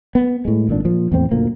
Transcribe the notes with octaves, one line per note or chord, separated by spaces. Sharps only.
B3
A2 G#3
G#1 A#2 D4
A#2 F3
E2 A2 B3 C4
F#1 D2 A#2 A#3